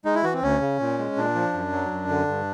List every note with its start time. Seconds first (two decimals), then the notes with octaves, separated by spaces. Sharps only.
0.05 G#3 D#4
0.15 E4
0.23 E3 F#4
0.34 C4
0.42 D2 C#4
0.61 C#3
0.80 A#2
0.99 G#3
1.17 A#2 D4
1.35 F3
1.53 F#2
1.72 F#3
1.91 F#2
2.09 D3
2.28 G2